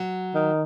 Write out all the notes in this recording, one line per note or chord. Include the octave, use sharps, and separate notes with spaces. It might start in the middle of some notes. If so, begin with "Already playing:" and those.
Already playing: F#3
D#3